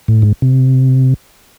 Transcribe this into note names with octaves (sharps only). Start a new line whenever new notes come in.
A2
G#2
C3